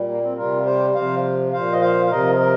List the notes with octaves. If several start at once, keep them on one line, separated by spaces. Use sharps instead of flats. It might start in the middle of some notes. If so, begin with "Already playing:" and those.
Already playing: A#2 G3
A#3
C4
C3 G3 F4 A#4
G4 C5
C3 F3 C5 F5
A#2 F3 C5 F5
D#5
C5 F5
F5
C3 F3 A#4 D#5
A#4 D#5